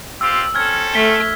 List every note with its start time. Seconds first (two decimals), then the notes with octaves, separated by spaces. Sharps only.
0.21 C4 F4 G4 E6
0.55 C4 C#4 A4 F6 G#6
0.94 A3 B6 G7